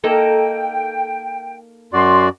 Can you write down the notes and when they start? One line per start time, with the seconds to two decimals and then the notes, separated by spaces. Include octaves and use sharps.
0.04 A#3 D#4 A4 G5
1.93 F#2 F#4 D5 C6